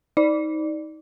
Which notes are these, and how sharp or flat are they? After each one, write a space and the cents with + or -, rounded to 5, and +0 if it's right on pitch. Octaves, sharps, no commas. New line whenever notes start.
D#4 +25 D5 +10